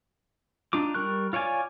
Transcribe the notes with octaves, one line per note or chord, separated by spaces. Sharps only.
D4 D#4 F4 D6
G3 A#4 C#6 F#6
F4 C#5 D5 G#5 D6